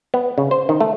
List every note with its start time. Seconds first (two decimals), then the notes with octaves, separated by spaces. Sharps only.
0.14 B3
0.38 C#3
0.51 C5
0.69 D#3
0.80 A3